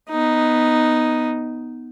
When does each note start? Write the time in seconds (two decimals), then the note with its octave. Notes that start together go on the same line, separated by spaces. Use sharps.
0.10 B3 D#4